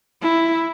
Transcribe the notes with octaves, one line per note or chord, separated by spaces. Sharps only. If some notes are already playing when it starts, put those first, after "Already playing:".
E4